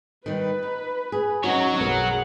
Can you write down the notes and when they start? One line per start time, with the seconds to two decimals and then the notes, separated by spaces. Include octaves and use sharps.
0.26 D#3 G3 B4
0.63 D#4
1.12 G#4
1.44 F#3 C#4 D#4 F#4 C#5
1.80 B1 F#2 B3 G#4 A#4 F#5